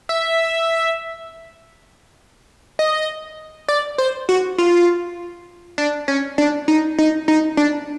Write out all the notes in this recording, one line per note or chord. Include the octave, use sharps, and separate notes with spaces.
E5
D#5
D5
C5
F#4
F4
D4
C#4
D4
D#4
D#4
D#4
D4